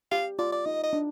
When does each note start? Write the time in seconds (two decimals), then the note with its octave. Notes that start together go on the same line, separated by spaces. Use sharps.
0.12 G4 F5
0.39 F4 D5
0.52 D5
0.66 D#4 D#5
0.84 D#5
0.93 D4